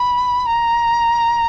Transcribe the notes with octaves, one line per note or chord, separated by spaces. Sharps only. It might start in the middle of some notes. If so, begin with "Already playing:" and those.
Already playing: B5
A#5